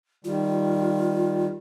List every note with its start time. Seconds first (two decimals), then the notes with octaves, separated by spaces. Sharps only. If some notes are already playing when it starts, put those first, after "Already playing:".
0.25 D#3 G3 F4